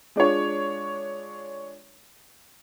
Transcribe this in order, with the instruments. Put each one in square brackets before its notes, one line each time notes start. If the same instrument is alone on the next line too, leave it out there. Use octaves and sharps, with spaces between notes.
[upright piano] G#3 D4 F4 C#5